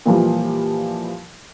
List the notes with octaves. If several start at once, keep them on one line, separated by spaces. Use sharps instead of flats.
A#2 E3 F3 G3